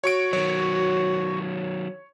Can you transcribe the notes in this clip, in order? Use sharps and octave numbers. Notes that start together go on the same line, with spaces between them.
F#4 C#5 C#6 D7
D#3 F#3 C#5